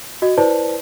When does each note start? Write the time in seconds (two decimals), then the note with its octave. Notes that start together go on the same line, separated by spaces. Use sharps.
0.22 F#4 D#5
0.37 E4 B4 C5 D5 A5